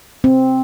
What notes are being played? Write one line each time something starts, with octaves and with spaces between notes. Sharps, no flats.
C4